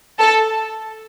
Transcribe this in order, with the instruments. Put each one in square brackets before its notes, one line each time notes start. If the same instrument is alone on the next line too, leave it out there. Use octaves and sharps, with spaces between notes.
[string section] A4 A5